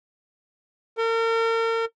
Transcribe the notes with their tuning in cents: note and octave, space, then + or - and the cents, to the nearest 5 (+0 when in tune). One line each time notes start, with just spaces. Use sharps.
A#4 -40